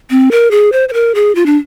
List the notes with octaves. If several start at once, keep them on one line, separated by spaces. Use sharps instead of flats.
C4
A#4
G#4
C5
C5
A#4
G#4
F4
D4